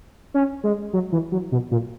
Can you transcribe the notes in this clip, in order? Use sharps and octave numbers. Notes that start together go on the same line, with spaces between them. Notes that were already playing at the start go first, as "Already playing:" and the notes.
C#4
G#3
F#3
E3
F#3
B2
A#2